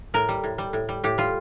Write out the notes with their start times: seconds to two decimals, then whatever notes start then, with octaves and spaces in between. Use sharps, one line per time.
0.14 A2 A#4
0.29 G3
0.44 A2
0.58 G3
0.73 A2
0.89 G3
1.04 A2 G4
1.18 G3 F4